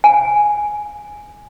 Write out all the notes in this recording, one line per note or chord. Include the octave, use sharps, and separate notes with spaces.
G#5